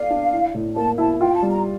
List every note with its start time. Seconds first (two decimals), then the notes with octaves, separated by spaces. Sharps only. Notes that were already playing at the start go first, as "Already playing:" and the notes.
Already playing: A4 D5 F5
0.10 D4
0.33 E4
0.54 A2
0.76 A#3 A5
0.98 E4 A5
1.21 F4 G5
1.36 A5
1.42 G3
1.51 A#5